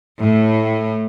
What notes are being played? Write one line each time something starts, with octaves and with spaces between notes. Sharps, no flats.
A2